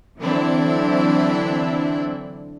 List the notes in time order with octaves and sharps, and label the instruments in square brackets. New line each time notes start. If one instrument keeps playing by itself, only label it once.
[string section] D3 E3 F#3 C4 D4 E4